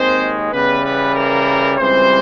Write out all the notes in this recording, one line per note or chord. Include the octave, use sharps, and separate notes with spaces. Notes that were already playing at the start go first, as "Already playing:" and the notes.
Already playing: D#2 D#3 G#3 C4 C5
C#3 E3 G3 B3 B4
B3 B4
A#3 A#4
C#2 C#3 E3 G3 C4 C5